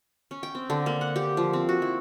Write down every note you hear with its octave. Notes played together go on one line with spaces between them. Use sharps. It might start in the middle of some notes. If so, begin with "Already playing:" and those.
C#4
G5
C4
D3
A#3
F#5
G4
F3
C4
F#4
E4